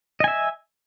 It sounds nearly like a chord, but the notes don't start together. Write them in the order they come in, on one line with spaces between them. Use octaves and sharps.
D#5 G#5 E5